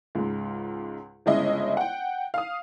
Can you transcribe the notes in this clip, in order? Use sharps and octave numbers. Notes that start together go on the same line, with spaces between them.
C#2 G#2
G1 C#3 G#3 E4 D#5
F#5 G5
F5 D#6